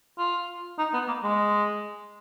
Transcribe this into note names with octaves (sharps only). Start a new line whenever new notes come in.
F4
D#4
B3
A#3
G#3